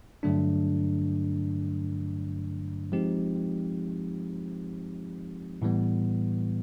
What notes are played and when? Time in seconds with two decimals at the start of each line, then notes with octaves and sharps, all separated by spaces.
0.23 G2 D3 F#3 A3 D4
2.92 F3 G#3 C4 D#4 G4
5.62 A2 E3 G3 B3